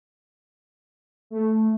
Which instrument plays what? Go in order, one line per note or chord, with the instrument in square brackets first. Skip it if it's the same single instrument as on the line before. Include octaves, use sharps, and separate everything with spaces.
[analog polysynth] A3